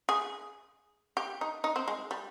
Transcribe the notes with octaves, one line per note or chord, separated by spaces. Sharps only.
G#4
G4
D#4
D#4
C4
G#3
G3